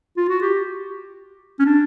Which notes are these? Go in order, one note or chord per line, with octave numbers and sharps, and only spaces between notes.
F4
F#4
G4
C#4
D4